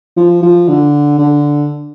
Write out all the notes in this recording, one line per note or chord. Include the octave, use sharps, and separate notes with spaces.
F3
F3
D3
D3